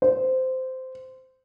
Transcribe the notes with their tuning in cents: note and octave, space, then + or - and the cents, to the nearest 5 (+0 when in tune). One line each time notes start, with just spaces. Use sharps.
C5 -15